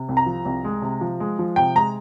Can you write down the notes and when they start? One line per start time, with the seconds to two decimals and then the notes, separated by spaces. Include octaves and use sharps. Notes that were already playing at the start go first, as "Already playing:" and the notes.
Already playing: C3
0.09 C2
0.17 A#5
0.26 F3
0.45 C2
0.64 G#3
0.82 C3
1.01 F3
1.20 G#3
1.39 F3
1.56 C3 G5
1.75 G#3 A#5